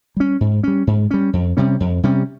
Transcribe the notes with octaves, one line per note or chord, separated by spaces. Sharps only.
G3 C#4
G#2
G3 C#4
G#2
G3 C#4
F2
C3 G3 C#4
F2
C3 G3 C#4